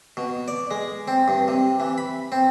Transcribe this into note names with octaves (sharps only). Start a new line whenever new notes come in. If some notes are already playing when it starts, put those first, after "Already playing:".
B2
D5
G#3
C4
G2
C3
E3
B5
C4